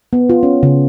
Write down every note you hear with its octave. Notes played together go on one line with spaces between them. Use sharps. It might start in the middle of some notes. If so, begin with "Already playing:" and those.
B3
F4
C#4
C#3